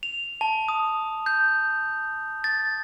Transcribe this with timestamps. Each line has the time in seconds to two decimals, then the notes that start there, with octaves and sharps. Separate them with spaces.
0.03 F7
0.41 A5
0.68 D#6
1.26 G6
2.44 A6